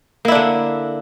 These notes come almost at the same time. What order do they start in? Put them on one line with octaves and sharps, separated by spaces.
A#3 E4 D4 D3